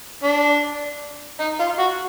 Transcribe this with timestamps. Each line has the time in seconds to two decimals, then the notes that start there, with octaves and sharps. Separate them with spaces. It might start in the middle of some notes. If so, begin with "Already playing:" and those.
0.23 D4
1.40 D#4
1.60 F4
1.79 F#4